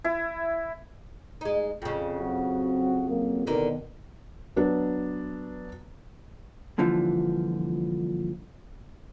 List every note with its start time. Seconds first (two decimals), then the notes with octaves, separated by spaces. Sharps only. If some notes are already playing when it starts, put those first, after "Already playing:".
0.04 E4
1.41 G#3 D#4
1.82 F2 C#3
2.18 F#3 C4 F#4
3.09 F#3 A#3
3.47 E2 B2 D3 D#3 A#4
4.56 F#3 B3 D4
6.78 G2 A#2 D3 E3 F3